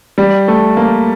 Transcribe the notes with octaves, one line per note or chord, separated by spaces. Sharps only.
G3
A3
A#3